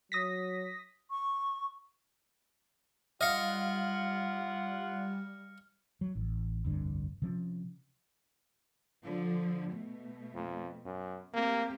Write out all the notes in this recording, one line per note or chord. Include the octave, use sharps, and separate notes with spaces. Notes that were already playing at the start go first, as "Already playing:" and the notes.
F#3 D#6 A#6 B6
C#6
G3 F4 D#5 F5 F#5 F6 C#7
F#3
A1
F1 C2 G2 D3
C3 F3 C#4
D3 F3
B2 A3
F2
F#2
A3 A#3 C4 G4